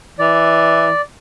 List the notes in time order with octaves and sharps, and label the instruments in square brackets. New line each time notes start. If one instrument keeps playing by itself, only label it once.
[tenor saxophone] E3 [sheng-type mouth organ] D5